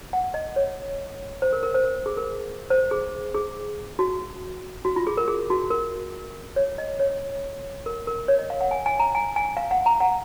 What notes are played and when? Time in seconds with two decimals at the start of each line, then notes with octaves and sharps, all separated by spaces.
0.13 F#5
0.34 D#5
0.56 C#5
1.42 C5
1.53 A#4
1.63 A#4
1.74 C5
1.84 A#4
2.06 G#4
2.17 A#4
2.70 C5
2.91 G#4
3.35 G#4
3.99 F#4
4.85 F#4
4.96 F4
5.07 G#4
5.17 A#4
5.28 G#4
5.50 F#4
5.70 A#4
6.56 C#5
6.78 D#5
7.00 C#5
7.86 A#4
8.07 A#4
8.28 C#5
8.39 D#5
8.50 F5
8.61 F#5
8.71 G#5
8.86 G#5
8.99 A#5
9.15 G#5
9.36 G#5
9.57 F5
9.71 F#5
9.86 A#5
10.00 F#5